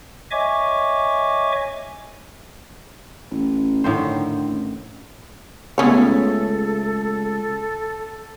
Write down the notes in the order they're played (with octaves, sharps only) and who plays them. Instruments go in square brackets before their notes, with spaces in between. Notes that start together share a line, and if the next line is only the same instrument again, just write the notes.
[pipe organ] C#5 D#5 E5 G#5 C#6 D6
[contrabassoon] A1
[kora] A2 D#3 C5 [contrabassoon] D3
[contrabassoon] A1
[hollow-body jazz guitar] C#2 C#3 A3 [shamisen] B3 C#4 C#5 [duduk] A4